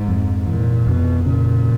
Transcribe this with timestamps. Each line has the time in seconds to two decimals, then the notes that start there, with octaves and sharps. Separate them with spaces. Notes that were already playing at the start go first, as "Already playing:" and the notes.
Already playing: G#2
0.08 F2
0.47 A#2 E3
0.87 F2 B2
1.26 A#2 C#3